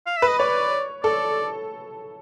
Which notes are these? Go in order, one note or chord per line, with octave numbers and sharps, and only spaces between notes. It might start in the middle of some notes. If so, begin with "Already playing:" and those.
F5
E5
B4
D#5
C#5 D5
A4 D5